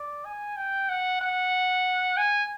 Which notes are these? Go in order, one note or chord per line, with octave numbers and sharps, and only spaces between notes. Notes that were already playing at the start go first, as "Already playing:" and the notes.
Already playing: D5
G#5
G5
F#5
F#5
G#5